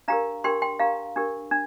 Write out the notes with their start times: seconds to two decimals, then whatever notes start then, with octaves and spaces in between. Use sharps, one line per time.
0.08 D4 G4 A#4 F5 A#5
0.44 D4 G4 A#4 G5 C6
0.62 G5 C6
0.79 D4 G4 A#4 F5 A#5
1.16 D4 G4 A#4
1.51 D4